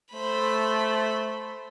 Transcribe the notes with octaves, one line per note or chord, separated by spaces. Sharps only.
A3 C5 B5